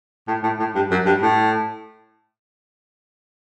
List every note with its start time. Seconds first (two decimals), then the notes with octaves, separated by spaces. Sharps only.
0.28 A2
0.43 A2
0.59 A2
0.75 G2
0.91 F#2
1.06 G2
1.22 A2